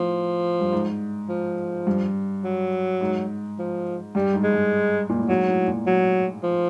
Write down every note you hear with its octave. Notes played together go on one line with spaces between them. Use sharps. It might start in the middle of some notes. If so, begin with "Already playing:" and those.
Already playing: A2 F3
G2
G#2
F3
G2
F#3
G#2
F3
G2 G3
G#2
G#3
G2
A#2
A2
G#2 F#3
A2
A#2
F#3
F3